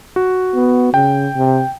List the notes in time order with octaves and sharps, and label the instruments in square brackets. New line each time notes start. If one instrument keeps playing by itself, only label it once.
[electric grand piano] F#4
[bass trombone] B3
[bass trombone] C#3 [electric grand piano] G5
[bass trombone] C3